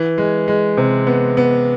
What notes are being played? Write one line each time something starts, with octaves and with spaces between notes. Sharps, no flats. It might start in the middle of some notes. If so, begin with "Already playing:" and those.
Already playing: E3
G#3
G#3
C3
B3
B3